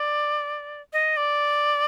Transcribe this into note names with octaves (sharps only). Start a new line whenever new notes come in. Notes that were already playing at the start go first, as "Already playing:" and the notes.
Already playing: D5
D#5
D5